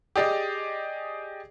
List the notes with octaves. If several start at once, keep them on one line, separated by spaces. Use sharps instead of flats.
G4 G#4 D5 D#5